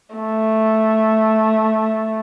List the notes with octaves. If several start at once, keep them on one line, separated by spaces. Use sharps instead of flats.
A3